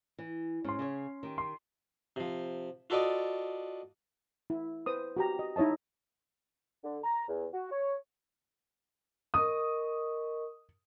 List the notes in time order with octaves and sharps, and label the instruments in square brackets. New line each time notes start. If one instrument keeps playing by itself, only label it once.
[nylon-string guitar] E3
[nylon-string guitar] G#2 [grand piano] C#4 C6
[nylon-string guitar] C#3 G#4 C#5
D#3 G4
[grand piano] C6
[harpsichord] C3 F3
F4 F#4 A4 B4 D5 D#5
[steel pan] E4
B4 C5 D#6
F#4 G4 A#5
D#5
D#4 E4 C#5 D#5 A5
[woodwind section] D3
A#5
E2
F#4
C#5
[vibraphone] A#4 D#5 C#6 [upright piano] D#6